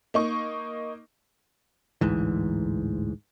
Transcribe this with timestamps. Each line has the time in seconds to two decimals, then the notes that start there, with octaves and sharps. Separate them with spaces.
0.14 A#3 D#4 C#6
2.01 A1 D2 G#2 E3